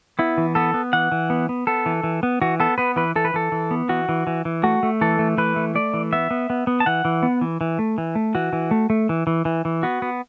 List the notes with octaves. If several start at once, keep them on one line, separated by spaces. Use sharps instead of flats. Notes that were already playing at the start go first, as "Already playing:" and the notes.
B3 E4
E3
B3 A4
B3
E3 F#5
E3
B3
B3
B3 A4
E3
E3
B3
E3 F#4
B3 A4
B3 B4
E3 B4
E3 A4
B4
E3 A4
E3
B3
E3 F#4
E3
E3
E3
A3 F#4
A3
E3 A4
A3
E3 B4
A3
A3 D5
E3
B3 E5
B3
B3
B3
A5
E3 F#5
E3
B3
E3
E3
A3
E3
A3
E3 F#4
E3
A3
A3
E3
E3
E3
E3
B3 F#4
B3